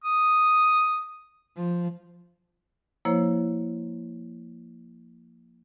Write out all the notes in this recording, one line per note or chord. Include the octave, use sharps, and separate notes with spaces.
D#6
F3
F3 A#3 E4 C5 C#5